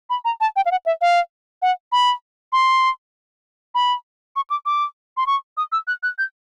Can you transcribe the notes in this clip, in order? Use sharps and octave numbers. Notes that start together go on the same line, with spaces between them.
B5
A#5
A5
G5
F5
F#5
E5
F5
F#5
B5
C6
B5
C#6
D6
D6
C6
C#6
D#6
E6
F#6
F#6
G6